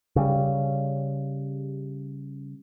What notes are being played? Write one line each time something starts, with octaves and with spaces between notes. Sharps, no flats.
C#3 G3